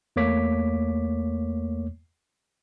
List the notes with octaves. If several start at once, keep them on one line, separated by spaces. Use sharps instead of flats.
E2 A3 A#3 C#5 D6 B6